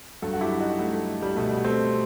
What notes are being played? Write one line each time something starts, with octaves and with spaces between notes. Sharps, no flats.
G2 F#3 F#4 A4
F#4
E4 G4
D#4 F#4
A3
A3
G3
B2 G3 A3
A3 C4